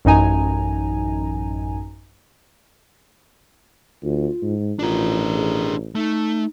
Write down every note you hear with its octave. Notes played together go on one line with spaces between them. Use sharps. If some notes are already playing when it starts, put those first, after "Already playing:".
A1 F#2 D#4 G#5 A#5
D2 F4
G#2
A1 D4 F4 A#4
G#4
A3 D#4